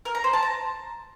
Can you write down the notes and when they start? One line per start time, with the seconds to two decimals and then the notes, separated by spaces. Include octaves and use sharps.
0.05 A#4
0.15 A#5
0.24 C5
0.33 A5
0.43 A#5